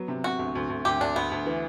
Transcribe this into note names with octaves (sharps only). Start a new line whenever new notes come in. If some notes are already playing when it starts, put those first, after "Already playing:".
Already playing: F#3 B3
C3
C3 F#4
D2
D2
D2
D2 G4
D2 D4
D2 B3
D2
E3